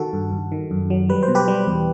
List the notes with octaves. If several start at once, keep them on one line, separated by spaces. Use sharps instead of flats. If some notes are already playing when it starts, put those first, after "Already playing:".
Already playing: D#3 F#4 A4
G2
G2
D#3
F#2
F#3
G3 B4
C5
B2
G4 B4
G3
E2